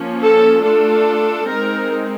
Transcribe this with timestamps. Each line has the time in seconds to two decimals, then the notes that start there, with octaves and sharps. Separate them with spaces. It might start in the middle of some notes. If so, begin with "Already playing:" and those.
Already playing: F3 A#3 C#4
0.20 A4
0.62 A3 D4 F4 A4
1.46 G#3 C4 D#4 A#4